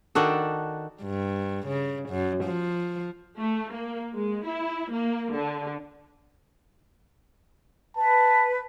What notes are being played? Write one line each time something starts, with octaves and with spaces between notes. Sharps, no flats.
D#3 D4 F#4 A4
G2
C#3
F#2
F3
A3
A#3
G#3
E4
A#3
D3
B4 A5